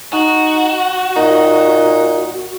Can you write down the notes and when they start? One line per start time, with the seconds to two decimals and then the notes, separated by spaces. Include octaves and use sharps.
0.13 D#4 F#4
1.16 A#2 D#4